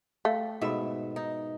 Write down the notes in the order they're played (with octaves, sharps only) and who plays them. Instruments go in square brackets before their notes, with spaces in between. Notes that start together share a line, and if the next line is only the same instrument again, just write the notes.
[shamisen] A3 [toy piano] F5 G5 C6
[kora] G#2 B2 E5 [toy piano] A4 B5
[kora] D#4